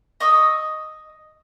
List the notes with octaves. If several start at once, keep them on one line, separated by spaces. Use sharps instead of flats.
D#5 C#6 D#6 E6